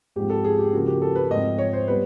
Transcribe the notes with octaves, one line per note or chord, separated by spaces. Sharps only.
G#2 F3 G#3 C4 G4
A4
G#4
G4
C#3 F3 A#3 F#4
G4
A4
B4
G#2 F3 A3 C4 D#5
C#5
C5
G3 B3 B4